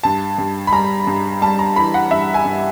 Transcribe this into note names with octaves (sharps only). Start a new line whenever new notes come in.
G2 A5
G2
B5
G3 A#5
G2
G3 A5
A#5
E3 B5
F#5
G2 E5
G#5
G2